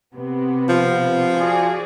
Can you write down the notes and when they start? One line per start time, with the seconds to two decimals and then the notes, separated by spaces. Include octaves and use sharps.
0.14 C3 B3
0.69 F3
1.37 F#4 G#4 D5